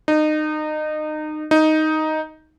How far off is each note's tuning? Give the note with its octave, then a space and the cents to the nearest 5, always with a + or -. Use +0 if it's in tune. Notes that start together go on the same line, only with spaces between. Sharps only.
D#4 -25
D#4 +5